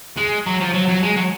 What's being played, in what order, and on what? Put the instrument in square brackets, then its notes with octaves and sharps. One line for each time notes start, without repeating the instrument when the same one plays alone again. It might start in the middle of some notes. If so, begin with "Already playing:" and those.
[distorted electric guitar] G#3
F#3
F3
F#3
F#3
G#3
F#3